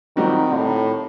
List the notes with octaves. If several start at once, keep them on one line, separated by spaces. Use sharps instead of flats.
A#2 D#3 G3 C4 D#4 F#4
A2